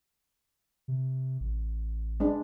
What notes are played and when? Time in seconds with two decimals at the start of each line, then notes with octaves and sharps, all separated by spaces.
0.88 C3
1.40 A1
2.20 G#3 D4